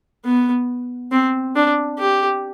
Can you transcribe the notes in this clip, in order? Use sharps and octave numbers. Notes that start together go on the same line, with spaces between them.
B3
C4
D4
G4